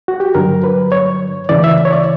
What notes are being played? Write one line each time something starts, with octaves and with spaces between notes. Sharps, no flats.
F#4
G4
G2 D3 F#3 A#4
B4
C#5
D2 C#3 E3 D5
E5
C#5
D5